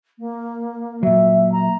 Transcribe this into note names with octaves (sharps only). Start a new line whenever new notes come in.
A#3
A#2 F#3 E5
A#5